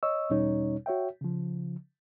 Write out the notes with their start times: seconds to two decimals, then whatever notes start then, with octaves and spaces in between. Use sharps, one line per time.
0.03 C#5 D#5 C#6 E6
0.30 E2 B2 G3 C#4 D#4 C#5
0.86 F#4 C#5 E5 G5
1.21 C#3 F3